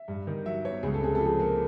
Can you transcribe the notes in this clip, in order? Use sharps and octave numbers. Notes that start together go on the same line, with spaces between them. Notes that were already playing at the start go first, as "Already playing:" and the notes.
Already playing: E5
G2
D#3
F#3 E5
B3 C#5
C#2 G#4
A4
C3 G#4
A4
F3
G#4
A#3